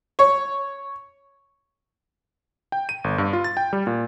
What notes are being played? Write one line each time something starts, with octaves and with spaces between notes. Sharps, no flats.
C#5
G5
D#7
G1
G2
F4
A6
G5
G3
A#2